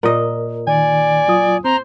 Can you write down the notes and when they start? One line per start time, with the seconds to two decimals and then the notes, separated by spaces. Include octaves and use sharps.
0.03 A#2 A#4 D#5
0.67 D#3 D5 G#5
1.28 F#3 F4 D#6
1.64 C4 C5 A#5